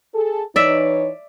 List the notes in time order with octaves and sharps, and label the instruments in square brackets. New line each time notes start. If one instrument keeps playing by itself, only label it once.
[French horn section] G#4 A4
[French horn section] E3 D#4 C#5 [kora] D5 E5